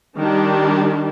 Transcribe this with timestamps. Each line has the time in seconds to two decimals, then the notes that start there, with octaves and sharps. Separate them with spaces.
0.16 D#3 G3 D4 G4